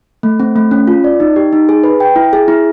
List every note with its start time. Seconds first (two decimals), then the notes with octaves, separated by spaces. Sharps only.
0.23 A3
0.40 C4
0.56 A3
0.71 C#4
0.88 F4
1.04 D5
1.20 D#4
1.36 G4
1.53 D#4
1.69 G#4
1.84 B4
2.00 G5
2.16 E4
2.33 G#4
2.48 E4